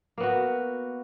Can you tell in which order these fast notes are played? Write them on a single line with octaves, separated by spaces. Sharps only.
A#3 B3 F#4